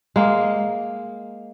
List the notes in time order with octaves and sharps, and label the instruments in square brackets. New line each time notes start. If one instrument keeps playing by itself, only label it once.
[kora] G#3 A#3